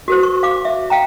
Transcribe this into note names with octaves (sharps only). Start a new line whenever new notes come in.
F#4 A#4 C5
C#6
F5 D6
E5
F5 G5 A#5